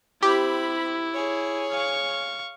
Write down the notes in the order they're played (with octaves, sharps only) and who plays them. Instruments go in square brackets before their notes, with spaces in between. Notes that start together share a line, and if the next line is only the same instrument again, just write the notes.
[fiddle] C4 B5 [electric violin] E4 [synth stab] G4
[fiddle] G#4 C#5
[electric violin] F5 C#6